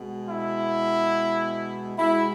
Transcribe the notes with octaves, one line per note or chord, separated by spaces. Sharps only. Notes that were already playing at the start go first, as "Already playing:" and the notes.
Already playing: B2 G#3
E4
B2 G#3 E4